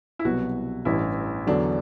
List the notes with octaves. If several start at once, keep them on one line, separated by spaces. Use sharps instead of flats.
E4
C2 B2 F#3 B3 F#4
A1 G2 E3 E4
E2 D3 F#3 D4